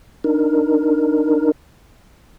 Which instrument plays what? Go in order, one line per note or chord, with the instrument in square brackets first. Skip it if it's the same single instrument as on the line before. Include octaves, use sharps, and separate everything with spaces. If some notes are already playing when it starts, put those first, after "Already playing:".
[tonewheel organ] D4 D#4 A#4